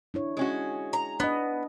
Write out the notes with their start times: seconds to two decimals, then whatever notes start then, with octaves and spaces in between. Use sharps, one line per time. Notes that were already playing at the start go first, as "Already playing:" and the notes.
0.14 D4 E4 C#5
0.37 G#3 C#4 F#4
0.93 A#5
1.20 B3 D4 D#5